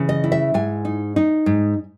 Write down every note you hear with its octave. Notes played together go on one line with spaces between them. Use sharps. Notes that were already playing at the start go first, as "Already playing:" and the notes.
Already playing: C#3 E3
D#5
E4
E5
G#2 G#5
D#4
D#4
G#2